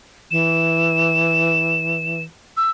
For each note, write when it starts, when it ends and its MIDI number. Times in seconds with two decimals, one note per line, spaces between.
0.31 2.24 52
0.31 2.22 100
2.57 2.70 88